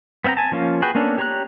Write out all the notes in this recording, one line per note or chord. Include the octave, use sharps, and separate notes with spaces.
B3 C4 E5 G5 A#5
G#5 A5
F3 A#3 C#4 F4
F#4 G#4 B4 G5
A#3 B3 C#4 D4 A4
G4 C#5 A#5 C#6 F#6